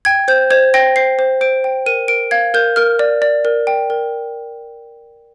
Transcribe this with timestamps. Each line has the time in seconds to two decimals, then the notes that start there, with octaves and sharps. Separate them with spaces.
0.05 G5 G#6
0.28 C5 G6
0.50 C5 G#6
0.74 G5 A#6
0.96 C5 C7
1.19 C5
1.41 C5 D7
1.64 G5
1.86 A#4 D#7
2.08 A#4 D7
2.31 F5 G#6
2.54 A#4 G6
2.76 A#4 F6
2.99 D5
3.22 D5
3.45 A#4
3.67 G5
3.90 A#4